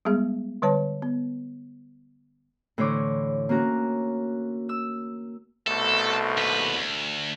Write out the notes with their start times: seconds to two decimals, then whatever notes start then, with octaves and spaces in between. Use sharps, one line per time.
0.05 G3 G#3 B3 G#4
0.62 D3 G3 B4 C#5 A5
1.02 B3
2.78 A2 D3 E3 C5 C#5 D6
3.49 A#3 C#4 F#4 A#5
4.69 E6
5.67 C2 B2 A3 A4
6.37 D#2 B4
6.76 D2